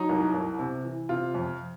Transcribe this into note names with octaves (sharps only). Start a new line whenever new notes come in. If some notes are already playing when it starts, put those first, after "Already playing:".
Already playing: F#3 D#4
C2
C2
C3
E3
C3 F4
F2